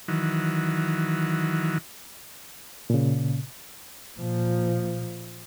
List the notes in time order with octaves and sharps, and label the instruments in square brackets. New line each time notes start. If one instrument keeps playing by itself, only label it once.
[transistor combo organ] D#3 E3 F#3
[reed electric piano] A#2 C#3
[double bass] A#2 F3